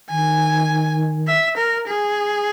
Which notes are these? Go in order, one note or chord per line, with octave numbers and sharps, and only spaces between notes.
D#3 G#5
E5
A#4
G#4